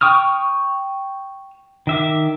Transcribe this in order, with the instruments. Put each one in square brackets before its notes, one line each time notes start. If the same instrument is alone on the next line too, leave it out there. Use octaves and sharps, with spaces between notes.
[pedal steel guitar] G5 C#6 D#6 F6
D#3 E5 D6